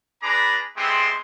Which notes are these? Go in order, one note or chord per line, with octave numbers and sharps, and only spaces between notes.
D4 G#4 B4 A#5 B5 D6
G#3 B3 C4 E4 G4 C6